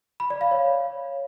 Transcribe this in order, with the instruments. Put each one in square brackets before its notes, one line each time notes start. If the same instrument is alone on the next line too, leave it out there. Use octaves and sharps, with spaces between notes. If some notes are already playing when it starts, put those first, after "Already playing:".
[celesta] B5
D5
F5
C#5